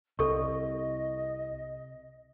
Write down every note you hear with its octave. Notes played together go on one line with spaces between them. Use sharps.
C2 C3 A4 D#5 C#6